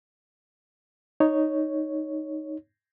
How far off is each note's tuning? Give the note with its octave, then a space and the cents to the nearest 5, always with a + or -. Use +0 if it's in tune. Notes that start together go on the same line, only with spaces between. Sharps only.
D#4 +0 C#5 +0